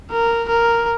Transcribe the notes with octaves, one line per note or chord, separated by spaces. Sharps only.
A#4
A#4